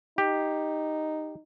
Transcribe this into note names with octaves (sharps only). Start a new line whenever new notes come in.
D#4 G4